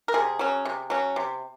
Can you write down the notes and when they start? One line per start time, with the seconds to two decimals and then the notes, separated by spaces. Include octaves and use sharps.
0.08 A#4
0.14 C3 G#4
0.39 F#3 C#4
0.65 C3
0.90 F#3 C#4
1.16 C3